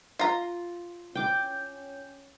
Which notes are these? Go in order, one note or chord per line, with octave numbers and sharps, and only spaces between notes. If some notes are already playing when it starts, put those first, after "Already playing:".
F4 A#5
C#4 G5 D6